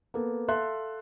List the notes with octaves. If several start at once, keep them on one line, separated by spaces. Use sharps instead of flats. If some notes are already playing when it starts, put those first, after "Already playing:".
A#3 B3 A4
A4 E5 F5 C6 F#6